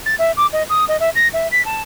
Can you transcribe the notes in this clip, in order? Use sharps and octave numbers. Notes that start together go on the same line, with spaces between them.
A6
E5
D6
D#5
D#6
D#5
E5
A#6
E5
B6
A5